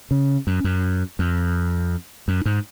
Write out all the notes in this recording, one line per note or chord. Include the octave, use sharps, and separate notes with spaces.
C#3
F#2
F#2
F2
F#2
G#2